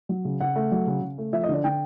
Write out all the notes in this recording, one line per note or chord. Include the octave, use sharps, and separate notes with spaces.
F#3
C#3
C#3 F#5
A3
F#3
C#3
C#3
A3
F3 E5
D#5
D3 D5
D3 G5